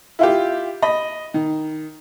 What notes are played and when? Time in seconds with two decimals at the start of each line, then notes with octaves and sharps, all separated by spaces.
0.19 E4 F4 G4
0.82 D#5 B5
1.34 D#3